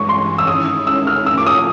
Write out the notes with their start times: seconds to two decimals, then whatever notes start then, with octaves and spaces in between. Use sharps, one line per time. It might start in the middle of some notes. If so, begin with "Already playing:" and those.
Already playing: G2 E3 G#3 C#6
0.09 C6
0.38 E6
0.47 D#3 G#3 C#4 E4 D#6
0.87 E6
1.07 F6
1.26 A2 F3 A#3 E6
1.38 D6
1.46 D#6